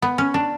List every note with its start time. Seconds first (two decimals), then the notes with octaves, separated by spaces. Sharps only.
0.02 B3
0.18 C#4
0.34 D4